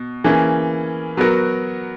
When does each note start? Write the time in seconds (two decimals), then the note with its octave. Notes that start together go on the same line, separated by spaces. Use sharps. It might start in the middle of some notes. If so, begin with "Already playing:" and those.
Already playing: B2
0.24 E3 A#3 C#4 G#4
1.17 F#3 B3 F#4 A#4